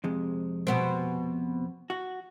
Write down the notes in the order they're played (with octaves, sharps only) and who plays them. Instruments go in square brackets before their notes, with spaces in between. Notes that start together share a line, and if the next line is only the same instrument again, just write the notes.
[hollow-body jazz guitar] F2 C3 G#3
[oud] B2 B3 C4
[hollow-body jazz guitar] F#4